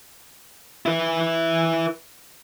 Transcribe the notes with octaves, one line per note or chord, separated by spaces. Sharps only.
E4 B4